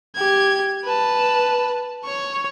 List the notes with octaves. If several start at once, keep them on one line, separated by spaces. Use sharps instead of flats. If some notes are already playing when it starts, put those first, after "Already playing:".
G4 G#6
B4 A5
C#5 C#6